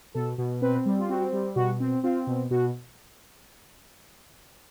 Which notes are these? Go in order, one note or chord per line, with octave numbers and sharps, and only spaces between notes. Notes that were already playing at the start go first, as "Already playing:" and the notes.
B2 A4
B2
C4 B4
G3
F4
C4 F#4
G3
B2 F#4
C4
C4 F4
B2
B2 F#4